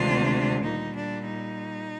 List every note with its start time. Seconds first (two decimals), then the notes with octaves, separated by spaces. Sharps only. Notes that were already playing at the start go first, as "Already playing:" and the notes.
Already playing: D2 C3 D#3 G#3 D4 F4
0.65 A#2 G3 D#4
0.96 D4
1.26 D#4